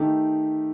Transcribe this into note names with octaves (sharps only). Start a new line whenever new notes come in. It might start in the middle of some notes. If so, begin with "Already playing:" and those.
Already playing: D#3 A3 D#4 G4